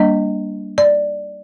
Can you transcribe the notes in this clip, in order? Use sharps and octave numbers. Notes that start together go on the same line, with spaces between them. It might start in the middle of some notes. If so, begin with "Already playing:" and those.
Already playing: G3 A#3 D4 D#5
D5